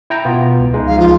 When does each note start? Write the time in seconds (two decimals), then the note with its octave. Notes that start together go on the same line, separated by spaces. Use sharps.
0.10 E4 G5 A#5
0.25 B2 B3 F4
0.60 C#2
0.74 G#3 D#4
0.87 F3 F5
0.99 F4